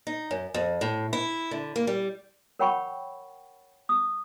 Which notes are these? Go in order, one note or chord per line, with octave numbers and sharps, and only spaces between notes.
D#4
F#2
F2
A2
E4
D3
A#3
G3
A#4 C#5 F#5 G5 B5 C#6
D#6